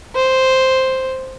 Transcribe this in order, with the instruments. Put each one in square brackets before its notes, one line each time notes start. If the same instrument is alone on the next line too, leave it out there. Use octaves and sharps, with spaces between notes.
[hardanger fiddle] C5